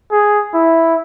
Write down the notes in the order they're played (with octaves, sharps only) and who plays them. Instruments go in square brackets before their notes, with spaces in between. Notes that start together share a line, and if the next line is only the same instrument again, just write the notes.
[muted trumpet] G#4
E4